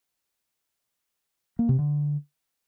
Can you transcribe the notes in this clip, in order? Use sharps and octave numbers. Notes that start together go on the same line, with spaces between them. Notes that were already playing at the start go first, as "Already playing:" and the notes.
A#3
C3
D3